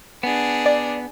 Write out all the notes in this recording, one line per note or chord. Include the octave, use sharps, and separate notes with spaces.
B3 D4 G#4
D5